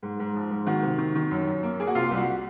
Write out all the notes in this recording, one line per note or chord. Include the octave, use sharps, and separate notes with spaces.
G#2
G#2
F3
G#2
D#3 F#4
C3
D#3
D#3
F#2
F#2
A#3
A#3 G#4
F#4
C3 F4
C2
F#4